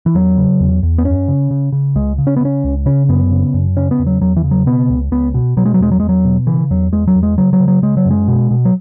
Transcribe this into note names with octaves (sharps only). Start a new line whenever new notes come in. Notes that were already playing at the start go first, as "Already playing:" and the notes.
E3
E2 F#3
C#3
E2
E2
B3
F#2 C#4
C#3
C#3
C#3
C#2 G#3
C#3
C#4
B3
C#3 C#4
C#2
C#3 C#4
F#2 B3
C#3
F#2
C#3 C#4
B3
E2
F#3
E2 F#3
E3
C#3
F#3
B2 B3
C#2
C#2 B3
B2
B2 F#3
G#3
F#3
E2 G#3
F#3
E2 G#3
F#3
B2
C#3 E3
E2 F#3
E2 G#3
F#3
E2
G#3
C#3 F#3
F#3
C#3
F#3
C#3 G#3
F#3
F#2
G#3
B2
B2
F#3